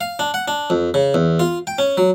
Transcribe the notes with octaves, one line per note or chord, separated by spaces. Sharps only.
F5
D4
F#5
D4
F2
C#3
E2
F4
G5
C#4
F#3